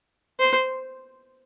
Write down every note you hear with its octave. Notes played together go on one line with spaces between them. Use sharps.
C5